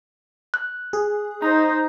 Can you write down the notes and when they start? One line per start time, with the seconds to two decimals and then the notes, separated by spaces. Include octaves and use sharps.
0.54 F#6
0.93 G#4
1.42 D#4 C5 A#5